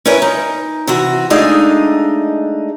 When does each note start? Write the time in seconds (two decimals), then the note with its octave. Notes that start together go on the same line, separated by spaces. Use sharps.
0.05 C#4 E4 A#4 B4 C#5
0.22 D#4
0.87 C3 E3 F#4
1.30 G#3 A3 D4 D#4 G#4 F5